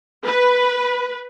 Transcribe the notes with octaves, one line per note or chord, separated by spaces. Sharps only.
B4